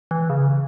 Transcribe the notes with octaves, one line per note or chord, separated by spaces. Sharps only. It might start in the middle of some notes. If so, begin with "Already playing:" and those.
E3
C#3